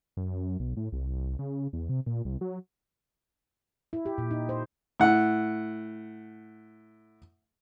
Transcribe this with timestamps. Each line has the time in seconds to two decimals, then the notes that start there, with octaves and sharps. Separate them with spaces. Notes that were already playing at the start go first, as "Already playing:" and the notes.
0.17 F#2
0.60 B1
0.77 A2
0.92 C2
1.39 C#3
1.73 E2
1.89 C3
2.06 A#2
2.25 C2
2.41 F#3
3.93 E4
4.06 G4
4.18 A#2
4.31 D#4
4.49 C5
5.00 A2 F#5